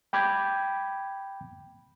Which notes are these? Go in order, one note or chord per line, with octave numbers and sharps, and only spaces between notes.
G5 B5 D6 G6 G#6